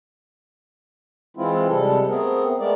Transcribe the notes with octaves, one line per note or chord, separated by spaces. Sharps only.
E3 G#3 C4 E4 F4
C3 G3 G#3 A4
A3 B3 C4 G#4 A#4
G#3 A3 B3 A#4 D5